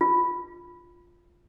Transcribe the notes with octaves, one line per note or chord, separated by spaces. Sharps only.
F4